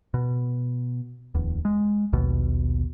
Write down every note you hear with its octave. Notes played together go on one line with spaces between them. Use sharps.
B2
D1 E2
G#3
A#1 D#2 B2